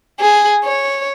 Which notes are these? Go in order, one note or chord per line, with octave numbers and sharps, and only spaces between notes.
G#4
C#5